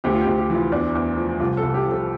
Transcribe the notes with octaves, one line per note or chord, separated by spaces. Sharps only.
D2 G4
F4
G4
D2
G4
E3
F4
E2 D4
E2
F3
C2 F4
A4
C2
G4
F3
A4